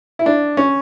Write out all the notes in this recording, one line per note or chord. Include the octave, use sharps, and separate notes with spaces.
E4
D4
C#4